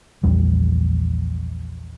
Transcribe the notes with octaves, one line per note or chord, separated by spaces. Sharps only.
A#1 E2 G3